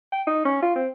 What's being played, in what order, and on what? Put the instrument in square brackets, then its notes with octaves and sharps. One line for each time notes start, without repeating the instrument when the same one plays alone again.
[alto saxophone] G5
D#4
C#4
F4
C4